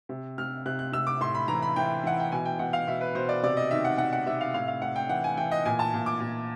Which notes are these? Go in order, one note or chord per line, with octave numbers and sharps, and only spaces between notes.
C3
C3 F6
C3 F#6
F#6
C3 E6
D6
A2 C6
B5
E3 A#5
B5
E3 G5
E3 F#5
G5
B2 G#5
G5
B2 F#5
F5
B2 E5
B4
B2 C5
D5
C3 D5
D#5
D#3 E5
F#5
D#3 F#5
F#5
C3 E5
F5
A2 F5
F5
A2 F#5
G5
E3 F#5
G#5
E3 G5
D#5
A#2 G#5
A5
A#2
D6
A#2